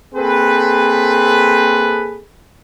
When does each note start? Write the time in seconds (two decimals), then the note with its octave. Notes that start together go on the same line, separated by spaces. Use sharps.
0.15 A#3 C4 G#4 A4 B4